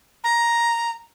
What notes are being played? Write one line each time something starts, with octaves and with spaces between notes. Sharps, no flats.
A#5